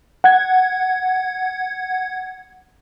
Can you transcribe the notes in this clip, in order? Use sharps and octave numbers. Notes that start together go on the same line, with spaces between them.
F#5 G#6